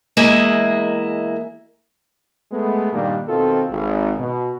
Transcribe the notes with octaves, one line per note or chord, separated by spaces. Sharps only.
E2 G#3 A#3 E4 D#5
G#3 A3 B3
G2 A#2 D#3 G3 A#3 D4
B2 D#3 C4 F4 A4
G#1
B2